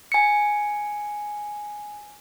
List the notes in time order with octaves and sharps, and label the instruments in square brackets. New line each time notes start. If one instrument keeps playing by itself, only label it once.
[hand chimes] G#5 C#7